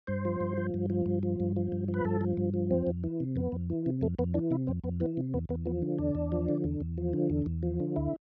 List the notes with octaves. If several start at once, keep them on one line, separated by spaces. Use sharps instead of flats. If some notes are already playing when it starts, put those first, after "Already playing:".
G2 C5
F3
G2
F3
G2
F3
G2
F3
G2
F3
G2
F3
B4
G2 A4
F3
G2
F3
F2 C4
F2
E3
C3
F2 B3
F2
E3
C3
F2 A3
F2 B3
E3 D4
C3 E4
F2 C4
F2 B3
E3 B3
C3
E2 B3
E2 B3
F3 B3
D3
E2 D4
E2
F3
D3
E2
E2
F3
D3
E2
E2
F3
D3
D2 E4